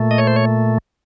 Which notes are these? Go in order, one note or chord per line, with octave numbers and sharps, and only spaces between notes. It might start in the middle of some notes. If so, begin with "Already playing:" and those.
Already playing: A#2 A3
D#5
C#5
C5
C#5